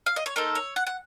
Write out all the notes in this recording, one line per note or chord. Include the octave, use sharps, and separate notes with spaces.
F5
D#5
C#5
A#3 D#4 A4 C5
C#5
F#5
F#5